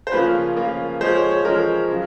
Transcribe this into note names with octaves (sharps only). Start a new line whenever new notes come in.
C5
C#3 F3 A#3 C#4 F4 B4
C#3 F3 A#3 C#4 F4
F3 G#3 C#4 C5
C#5
C#5
F3 G#3 C#4 A#4
C#3 F#3